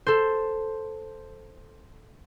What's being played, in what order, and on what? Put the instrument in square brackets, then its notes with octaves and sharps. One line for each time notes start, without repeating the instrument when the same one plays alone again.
[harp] A4 C5